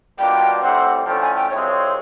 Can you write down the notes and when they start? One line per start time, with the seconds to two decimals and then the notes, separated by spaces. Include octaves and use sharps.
0.19 B2 G3 A#3 D4 F4 G5
0.62 A2 E3 G3 C4 F#5
1.06 D3 F3 A3 C#4 E4 G5
1.22 G#5
1.36 G5
1.50 C2 C3 F3 G#3 C4 C#5